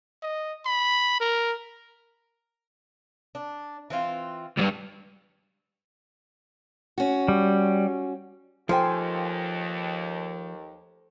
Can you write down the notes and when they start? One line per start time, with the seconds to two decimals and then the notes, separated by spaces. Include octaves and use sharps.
0.23 D#5
0.66 B5
1.20 A#4
3.35 D4
3.90 E3 C4 F4
4.58 C#2 G2
6.98 C#4 F#4
7.28 G3
8.69 D#2 F3 A4 C5 G5 G#5 C6